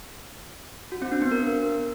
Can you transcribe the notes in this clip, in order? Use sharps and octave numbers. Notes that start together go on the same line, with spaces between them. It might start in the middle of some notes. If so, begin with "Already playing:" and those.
F#4
C4
D4
B3
A#4